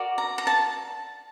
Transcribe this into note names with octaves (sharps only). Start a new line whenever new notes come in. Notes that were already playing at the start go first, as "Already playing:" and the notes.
Already playing: F#4 A#4 D5
A#5
A#5
A5